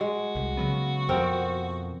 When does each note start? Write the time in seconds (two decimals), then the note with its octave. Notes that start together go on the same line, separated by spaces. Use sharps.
0.01 G#3 F#4
0.36 C2
0.57 C#3 F#3 B3
1.09 F2 B2 F3 C4 A#4